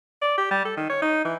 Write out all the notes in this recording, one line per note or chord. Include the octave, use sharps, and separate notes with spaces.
D5
G4
G3
A4
D#3
C#5
D#4
E3